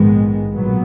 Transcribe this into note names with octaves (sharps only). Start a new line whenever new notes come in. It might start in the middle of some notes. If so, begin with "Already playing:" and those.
Already playing: A#1 G#2 D#3 G#3 B3
B1 A#2 F#3 B3